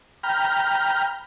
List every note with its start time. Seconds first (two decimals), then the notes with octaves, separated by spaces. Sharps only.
0.23 G5 A#5 B5 F6